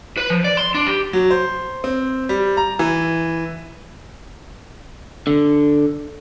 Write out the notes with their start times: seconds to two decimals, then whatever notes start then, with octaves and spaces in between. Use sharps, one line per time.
0.17 B4
0.30 F3
0.44 D5
0.57 C6
0.74 D4
0.87 G4
1.13 F#3
1.31 C5
1.84 C4
2.29 G3
2.57 A#5
2.79 E3
5.27 D3